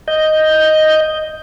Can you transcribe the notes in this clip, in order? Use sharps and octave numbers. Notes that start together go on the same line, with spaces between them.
D#5 G6